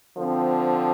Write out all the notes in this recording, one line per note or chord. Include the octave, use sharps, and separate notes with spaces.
D3 F3 C4